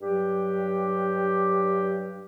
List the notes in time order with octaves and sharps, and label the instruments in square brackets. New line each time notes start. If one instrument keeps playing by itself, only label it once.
[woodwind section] G2 F#3 G4